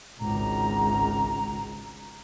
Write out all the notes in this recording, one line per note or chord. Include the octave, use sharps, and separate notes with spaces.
G#1 C#2 A#5